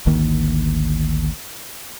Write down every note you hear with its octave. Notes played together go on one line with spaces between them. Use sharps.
G#1 D2 D#3 A#3